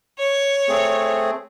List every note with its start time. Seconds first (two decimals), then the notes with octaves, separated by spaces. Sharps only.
0.19 C#5
0.69 A3 C4 G#4